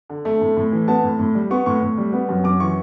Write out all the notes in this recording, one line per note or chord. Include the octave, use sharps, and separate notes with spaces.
D3
A3
A2
A2
E3
B3 A5
A2
A2
G3
B3 C#6
A2 C#6
A2
G3
B3
F#2
F#2 D6
E3 C#6